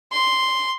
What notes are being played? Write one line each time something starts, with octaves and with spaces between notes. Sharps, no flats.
C6